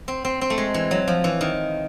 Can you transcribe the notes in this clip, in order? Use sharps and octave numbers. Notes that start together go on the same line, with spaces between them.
C4
C4
C4
A3
G#3
E3
F#3
F3
E3
D#3